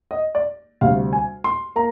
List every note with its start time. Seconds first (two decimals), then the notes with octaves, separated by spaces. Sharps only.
0.11 D#5
0.35 D5
0.81 D2 C3 G3 F5
1.13 G#5
1.44 C6
1.76 A#3 A#5